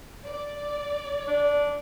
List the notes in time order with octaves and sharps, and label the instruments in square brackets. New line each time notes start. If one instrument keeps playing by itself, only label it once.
[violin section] D5
[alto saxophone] D4